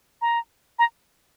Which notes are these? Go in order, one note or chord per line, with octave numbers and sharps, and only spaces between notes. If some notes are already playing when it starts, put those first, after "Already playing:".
A#5
A#5